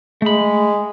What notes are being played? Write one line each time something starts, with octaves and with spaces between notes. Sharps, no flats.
G#3 A3 B5